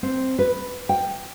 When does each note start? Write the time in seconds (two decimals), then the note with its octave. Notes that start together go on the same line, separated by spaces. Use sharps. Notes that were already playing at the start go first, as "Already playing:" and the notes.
0.03 C4
0.39 B4
0.89 G5